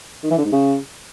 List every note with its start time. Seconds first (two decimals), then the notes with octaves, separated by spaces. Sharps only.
0.24 D#3
0.31 E3
0.38 D3
0.45 G#2
0.52 C#3